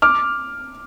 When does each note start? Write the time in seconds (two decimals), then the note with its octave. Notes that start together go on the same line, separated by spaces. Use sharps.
0.02 D6 F6